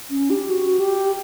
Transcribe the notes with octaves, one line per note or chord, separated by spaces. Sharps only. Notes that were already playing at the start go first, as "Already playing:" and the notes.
C#4
G4
F#4
G4